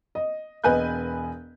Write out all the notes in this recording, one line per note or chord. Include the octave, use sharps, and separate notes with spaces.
D#5
E1 B4 D#5 G#5 F#6 G6